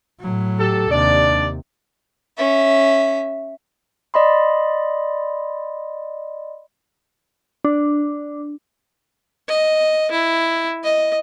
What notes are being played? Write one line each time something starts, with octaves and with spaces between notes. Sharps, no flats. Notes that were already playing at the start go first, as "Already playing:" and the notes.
A2 F#3
G4 A4
D#2 C3 D4 D5
C#4 E5
D5 D#5 B5 C6
D4
D#5
E4
D#5